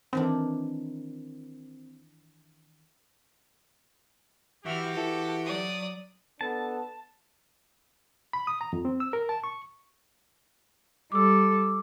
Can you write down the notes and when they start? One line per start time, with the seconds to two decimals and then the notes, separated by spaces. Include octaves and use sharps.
0.13 D#3 E3 C4 D4
4.65 E3 E4 F#4 G4 F6
4.96 E3 A4
5.45 F#3 D5 D#6
6.41 B3 D4 A4 A5
8.33 B5
8.47 D#6
8.61 A#5
8.73 F2
8.85 C4
9.00 E6
9.13 A#4
9.29 A5
9.44 C#6
11.12 G3 A4 D6 E6